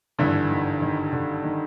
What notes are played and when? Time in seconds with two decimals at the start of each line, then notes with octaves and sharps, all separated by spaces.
0.19 G#1 G2 D3 E3
0.51 D#3
0.82 D#3
1.13 D3
1.44 D#3